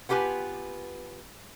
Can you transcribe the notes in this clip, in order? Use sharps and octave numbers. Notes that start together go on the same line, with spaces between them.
B3 F4 G4 B4 G#5